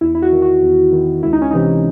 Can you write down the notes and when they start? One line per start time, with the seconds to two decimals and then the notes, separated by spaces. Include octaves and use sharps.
0.01 E2 E4
0.15 E4
0.22 F#4
0.32 D#3
0.42 F#4
0.62 E2
0.92 D#3
1.23 C#2 E4
1.33 D#4
1.42 C#4
1.51 C3 E3 D#4